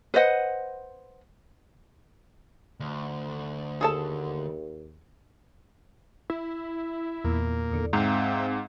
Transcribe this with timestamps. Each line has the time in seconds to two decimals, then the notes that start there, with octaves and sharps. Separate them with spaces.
0.14 B4 C5 D#5 F#5
2.80 D2
3.81 D#2 G#4 A4 A5
6.30 E4
7.24 E2 A#2 A#3
7.72 E2 D3
7.93 G#2 C4 E5 F5 G5 A#5